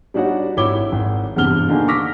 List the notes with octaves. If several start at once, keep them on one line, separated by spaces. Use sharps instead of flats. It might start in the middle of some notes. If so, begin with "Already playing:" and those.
G3 D4 D#4 F#4 C#5 F#5
G#1 E4 C#5 D6 G7
G#1
E2 G2 C3 F6 G7
D3 D#3 A#3 G#4
C#6 D6 E6 F6 A#6 B6